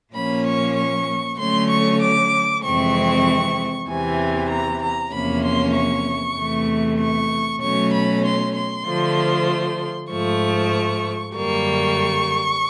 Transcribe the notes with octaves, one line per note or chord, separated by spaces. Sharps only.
A#2 F3 A#3 C#4 B5
C#6
C#6
D3 F#3 A3 C#4 C6
C#6
D6
F2 C3 E3 G#3 C4 C#6
E2 C3 E3 G#5
A#5
A#5
E2 C3 F3 A#3 C#4 B5
C6
C#6
E2 C3 E3 A3
C#6
B2 F#3 A3 C#4 C#6
B5
C6
C6
D3 F3 A3
G#2 F3 A3 C#6
F#2 D3 G3 A#3 C#6